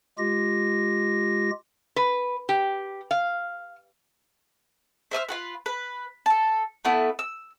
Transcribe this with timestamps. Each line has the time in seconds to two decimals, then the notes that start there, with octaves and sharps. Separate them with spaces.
0.18 G#3 F4 G4 A#6
1.96 B4
2.49 G4
3.11 F5
5.11 C5 E5 D#6 F6
5.29 F4 F#4 B4
5.66 B4
6.26 A4 A5
6.85 A3 B3 E4
7.19 E6